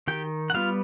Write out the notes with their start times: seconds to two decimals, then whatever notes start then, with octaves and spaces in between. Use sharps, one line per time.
0.08 D#3 G4 G5
0.50 F#5
0.54 G3 B3 F4 F5